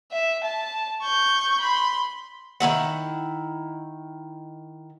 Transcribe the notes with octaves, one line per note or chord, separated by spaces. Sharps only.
E5
A5
C#6 G6
B5 C6
D#3 C#4 E4 F#5